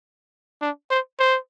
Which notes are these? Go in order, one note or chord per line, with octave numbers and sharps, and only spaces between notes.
D4
C5
C5